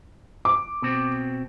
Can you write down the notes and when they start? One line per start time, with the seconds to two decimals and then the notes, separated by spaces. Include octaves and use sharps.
0.45 D6
0.82 B2 C4